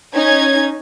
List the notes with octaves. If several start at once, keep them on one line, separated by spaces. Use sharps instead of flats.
C#4 D#4 G#6